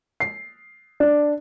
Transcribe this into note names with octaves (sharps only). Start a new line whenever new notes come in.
C7
D4